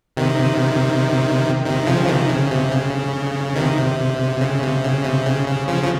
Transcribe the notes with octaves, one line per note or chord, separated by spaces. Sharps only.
C3 D#3
C3 D#3
C#3 F3
C3 D#3
C#3
C3
C#3
C3 D#3
C3
C#3
C3
C#3
C3
C#3
C#3
C#3 F3
F3